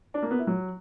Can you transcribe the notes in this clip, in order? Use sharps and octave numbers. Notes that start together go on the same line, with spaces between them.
D4
A#3
B3
E4
F#3